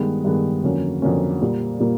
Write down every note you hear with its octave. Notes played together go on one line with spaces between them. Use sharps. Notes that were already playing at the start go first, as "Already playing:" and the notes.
Already playing: G2 D#3 G#3 B3
G2 D#3 G#3 B3
F2 D3 F#3 A#3 C#4
F2 D3 F#3 A#3 C#4
A#2 G3 A#3
A#2 G3 A#3